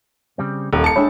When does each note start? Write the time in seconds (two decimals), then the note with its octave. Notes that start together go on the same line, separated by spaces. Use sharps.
0.38 C#3 G3 C4
0.73 D#1 A#3 D#4 A4
0.84 A5 C#7
0.96 G3 G#3 D4 E4 G#4 C#5